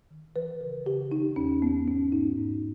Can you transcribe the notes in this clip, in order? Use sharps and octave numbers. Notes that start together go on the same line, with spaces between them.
D#3
E3 B4
C#3 A#4
C#3 G4
D#3 D#4
E2 C#4
E2 B3
G#2 C#4
G#2 D#4
G#2